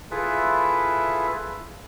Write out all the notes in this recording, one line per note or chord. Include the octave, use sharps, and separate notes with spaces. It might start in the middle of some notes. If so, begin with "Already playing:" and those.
E4 F4 G#4 A4 B4 E5